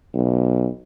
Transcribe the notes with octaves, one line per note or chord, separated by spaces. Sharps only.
B1